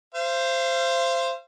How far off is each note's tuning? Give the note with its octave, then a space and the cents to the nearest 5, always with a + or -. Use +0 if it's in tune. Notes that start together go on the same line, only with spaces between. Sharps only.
C5 +0 F5 -40